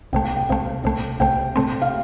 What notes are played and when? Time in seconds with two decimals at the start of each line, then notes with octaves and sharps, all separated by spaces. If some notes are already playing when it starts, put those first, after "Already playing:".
0.13 C2 C3 A3 G5
0.25 G5
0.37 G5
0.49 C2 C3 A3 F5
0.84 C2 C3 A3
1.20 C2 C3 A3 G5
1.56 C3 A3 C4
1.82 F5